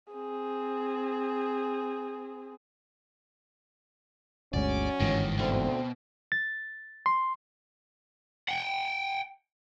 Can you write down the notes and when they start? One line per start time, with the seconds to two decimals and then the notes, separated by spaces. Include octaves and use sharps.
0.13 C4 G#4
4.53 G1 D2 F#3 G#3 C#4 D5
5.00 G1 D#2 G#2 D#3 E3
5.39 D2 B2 C4
6.32 A6
7.06 C6
8.48 F#5 G5